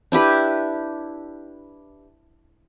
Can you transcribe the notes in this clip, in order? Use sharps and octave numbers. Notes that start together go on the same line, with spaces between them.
D4 E4 G4 B4